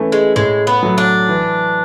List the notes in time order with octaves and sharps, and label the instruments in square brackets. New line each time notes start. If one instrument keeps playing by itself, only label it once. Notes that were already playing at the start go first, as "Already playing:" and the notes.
Already playing: [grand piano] E3 A3 C#4
[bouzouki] G#3
[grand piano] A2 [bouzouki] G#3
[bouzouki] B3
[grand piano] F#3 A3
[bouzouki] D4
[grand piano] E3